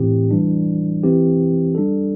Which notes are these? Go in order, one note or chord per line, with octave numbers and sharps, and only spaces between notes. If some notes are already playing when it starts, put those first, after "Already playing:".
Already playing: A2 E3 C4 G4
E3 G3 D4
E3 C4 G4
G3 D4 A4